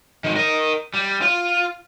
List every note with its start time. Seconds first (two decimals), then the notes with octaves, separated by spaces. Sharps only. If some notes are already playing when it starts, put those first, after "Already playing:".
0.24 D#3 G#3
0.36 A#4 D#5
0.94 G3
1.22 F4